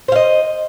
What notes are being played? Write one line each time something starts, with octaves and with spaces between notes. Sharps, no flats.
C5 D#5 F5